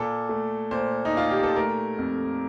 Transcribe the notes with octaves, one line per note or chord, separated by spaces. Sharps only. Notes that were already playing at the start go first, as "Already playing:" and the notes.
Already playing: A#2 A4
A3
A#2 C5
D#4
A#2 F4
G4
A4
A3 A#4
F2